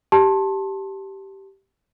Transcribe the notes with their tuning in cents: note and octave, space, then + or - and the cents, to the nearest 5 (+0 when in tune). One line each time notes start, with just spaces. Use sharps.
G4 -10 A5 +0 C6 +30